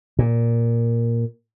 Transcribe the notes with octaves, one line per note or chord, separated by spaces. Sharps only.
A#2